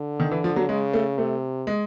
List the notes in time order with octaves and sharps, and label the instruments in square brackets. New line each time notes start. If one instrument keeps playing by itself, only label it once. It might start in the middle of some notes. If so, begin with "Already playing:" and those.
Already playing: [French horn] D3
[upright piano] D#3
E3
F3
F#3
[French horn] C#3 [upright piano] G#3
[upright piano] A3
[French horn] C3 [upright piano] A3
[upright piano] G#3